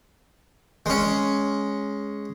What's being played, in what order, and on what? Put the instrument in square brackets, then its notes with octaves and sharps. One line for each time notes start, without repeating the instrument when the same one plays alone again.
[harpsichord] G#3 C#4